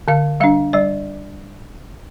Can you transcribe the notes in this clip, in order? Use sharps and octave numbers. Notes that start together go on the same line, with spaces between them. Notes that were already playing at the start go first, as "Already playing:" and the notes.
D3 F5
G3 D4 F5
G3 D5